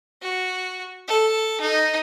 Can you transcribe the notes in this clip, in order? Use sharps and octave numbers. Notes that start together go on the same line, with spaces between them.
F#4
A4
D#4